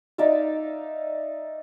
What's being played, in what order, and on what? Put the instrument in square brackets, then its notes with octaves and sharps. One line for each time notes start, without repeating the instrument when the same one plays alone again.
[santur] D#4 D5 E5 F5